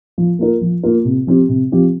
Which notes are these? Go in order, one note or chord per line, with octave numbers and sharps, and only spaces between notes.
F3
A#3 F4 A#4
F3
A#3 F4 A#4
C3
F3 C4 G4
C3
F3 C4 G4